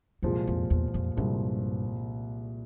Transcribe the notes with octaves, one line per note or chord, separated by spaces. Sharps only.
C2 F2 A#2 F3 G#3
F2
E2
F2
C2 G2 A#2 F3 G#3